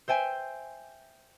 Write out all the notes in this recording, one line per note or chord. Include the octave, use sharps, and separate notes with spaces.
C5 E5 G5 G#5